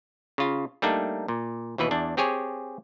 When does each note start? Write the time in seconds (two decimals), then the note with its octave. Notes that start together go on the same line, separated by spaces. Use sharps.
0.38 C#3 F4
0.82 G3 A3 A#3 D4 D#4
1.28 A#2
1.78 D#2 B2 E3 B4
1.91 E2 D4
2.17 C4 G4 G#4 C#5 G#5